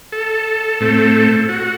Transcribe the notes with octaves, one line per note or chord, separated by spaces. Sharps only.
A4
A2 A3 C4
F#4